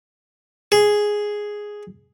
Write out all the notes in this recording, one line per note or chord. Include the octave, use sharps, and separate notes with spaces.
G#4